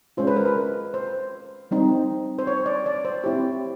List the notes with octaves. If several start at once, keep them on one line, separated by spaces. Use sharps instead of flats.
G#3 C#4 F4 C5
B4
A#4
B4
C5
G3 C4 D#4
C5
C#5
D5
D5
C5
C4 E4 G4 C#5